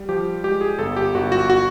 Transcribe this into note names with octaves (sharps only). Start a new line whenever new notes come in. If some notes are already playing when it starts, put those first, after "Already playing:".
Already playing: G3
F3 G4
G#3 G4
G#4
G1 A4
G4
G1 F#4
F#4
F#4